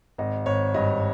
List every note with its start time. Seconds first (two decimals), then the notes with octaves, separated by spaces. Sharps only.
0.18 G#1 D#5
0.46 G#1 C#5
0.74 G2 D#5